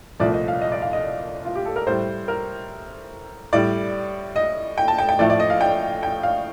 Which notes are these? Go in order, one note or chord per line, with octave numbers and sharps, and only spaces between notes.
C2 A#2 F3 A3 D5
D#5
F5
D#5
D5
F5
D#5
F4
G4
A4
A#4
A2 G3 C5
A#4
A2 G3 D5
D#5
G5
A5
G5
G5
A2 F3 A3 D5
D5
D#5
F5
G5
G5
F5